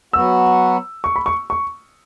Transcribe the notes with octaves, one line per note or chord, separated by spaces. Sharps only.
F#3 B3 F#4 E6
C#6
B5
C#6
C#6